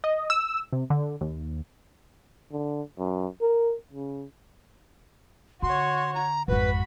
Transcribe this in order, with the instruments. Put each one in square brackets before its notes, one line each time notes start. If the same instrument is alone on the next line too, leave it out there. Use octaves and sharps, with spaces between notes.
[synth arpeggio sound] D#5
E6
C3
D3
D#2
[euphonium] D3
F#2
A#4
C#3
[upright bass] D3 [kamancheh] F#4 C#5 [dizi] C6
[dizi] A#5
[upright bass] G#1 F2 [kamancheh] F#4 B5 [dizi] B4